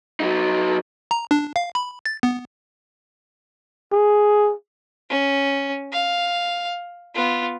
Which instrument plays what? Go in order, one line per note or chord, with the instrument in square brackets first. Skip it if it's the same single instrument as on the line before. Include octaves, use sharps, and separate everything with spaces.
[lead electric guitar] F#3 D#4
[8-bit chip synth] A#5
D4
F5
B5
A6
B3
[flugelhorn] G#4
[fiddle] C#4
F5
B3 F4